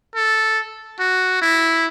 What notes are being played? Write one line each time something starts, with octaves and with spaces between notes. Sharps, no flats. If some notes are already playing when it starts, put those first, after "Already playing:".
A4
F#4
E4